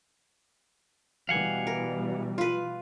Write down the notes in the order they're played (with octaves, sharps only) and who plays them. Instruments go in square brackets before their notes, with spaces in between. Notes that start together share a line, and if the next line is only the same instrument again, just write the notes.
[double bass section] B2 E3 G3 [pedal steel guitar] F5 F#5 G#5
[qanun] A#4
F4 B4